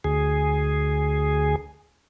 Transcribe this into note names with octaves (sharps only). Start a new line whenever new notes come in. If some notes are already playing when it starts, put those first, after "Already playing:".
D2 G#4